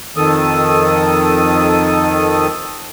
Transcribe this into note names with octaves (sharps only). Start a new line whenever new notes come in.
F2 D#3 A4 D#6